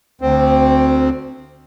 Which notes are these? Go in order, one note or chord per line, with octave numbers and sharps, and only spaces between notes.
D2 C4